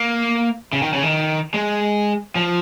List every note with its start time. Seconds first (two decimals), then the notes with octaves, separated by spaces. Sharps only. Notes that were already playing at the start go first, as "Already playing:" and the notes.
Already playing: A#3
0.73 C#3
0.82 D#3
0.93 C#3
1.03 D#3
1.54 G#3
2.35 F3